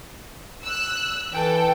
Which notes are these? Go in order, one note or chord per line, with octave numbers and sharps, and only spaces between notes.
E6 F#6
E3 A4 G5